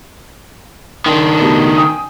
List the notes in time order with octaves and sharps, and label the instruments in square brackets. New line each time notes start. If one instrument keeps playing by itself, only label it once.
[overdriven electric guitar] D#3 D4 [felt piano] G5 C6
[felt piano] B2 A3 G4
G5 G#5 D#6